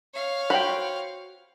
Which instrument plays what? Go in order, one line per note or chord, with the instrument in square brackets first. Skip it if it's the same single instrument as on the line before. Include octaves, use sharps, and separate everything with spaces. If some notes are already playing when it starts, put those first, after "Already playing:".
[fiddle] C#5 F5
[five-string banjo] F#4 C5 [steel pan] G5 B5